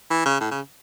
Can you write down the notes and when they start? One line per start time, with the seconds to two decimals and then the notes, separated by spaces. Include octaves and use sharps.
0.11 E3
0.26 C#3
0.41 A2
0.51 C#3